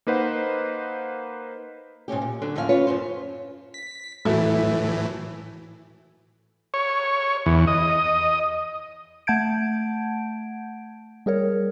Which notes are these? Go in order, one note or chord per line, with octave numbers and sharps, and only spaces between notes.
A#3 D#4 B4 C5 F#5
G#2 B2 C#4 G4
A#2
D3 F#3 D4
D#2 A2 F3 C#4 E5 F5
C#4 F4 B4 C#5
F#2 A2 C5
B6
A2 E3 F#3 A3 E4
C#5
E2
D#5
A3 F#5 A5 G6 G#6 D7
G3 G#4 A#4 C#5